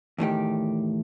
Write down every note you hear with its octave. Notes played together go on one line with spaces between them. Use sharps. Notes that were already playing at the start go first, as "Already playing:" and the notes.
E2 A2 D#3 G4